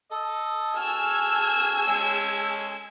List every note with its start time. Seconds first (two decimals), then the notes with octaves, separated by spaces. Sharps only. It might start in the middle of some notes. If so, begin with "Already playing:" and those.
0.11 A4 D#5
0.75 F#4 G#4 G#5 E6 F6 G#6
1.87 G#3 C#4